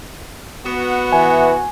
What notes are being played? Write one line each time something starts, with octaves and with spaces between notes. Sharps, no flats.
B3 F#4
E3 G#5